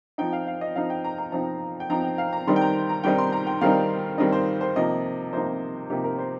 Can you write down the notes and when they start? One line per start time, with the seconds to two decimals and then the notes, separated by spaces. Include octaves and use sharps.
0.18 F3 C4 D#4 G5
0.33 F5
0.47 F5
0.61 D#5
0.76 F3 C4 D#4 F5
0.90 G5
1.04 A#5
1.18 A#5
1.32 F3 C4 D#4 A#5
1.80 G5
1.90 F3 C4 D#4 A#5
2.04 G5
2.18 F5
2.33 A#5
2.47 D#3 G3 C4 D#4 C6
2.56 G5
2.61 A#5
2.89 A#5
3.04 D#3 G3 C4 D#4 G5
3.18 C6
3.32 A#5
3.47 G5
3.61 D#3 G3 C4 D#4 F5
4.18 D#3 G3 C4 D#4 D#5
4.32 C5
4.61 C5
4.76 C3 F3 A#3 D#4 D#5
5.33 C3 F3 A#3 D#4 C5
5.90 C3 F3 A#3 D#4 G4
6.04 A#4
6.18 C5